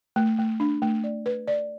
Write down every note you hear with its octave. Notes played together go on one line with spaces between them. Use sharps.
A3
A3
D4
A3
D5
B4
D5